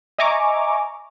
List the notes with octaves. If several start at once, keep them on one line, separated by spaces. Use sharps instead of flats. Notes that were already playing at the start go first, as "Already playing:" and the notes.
D#5 E5 G#5 A#5 C#6 D6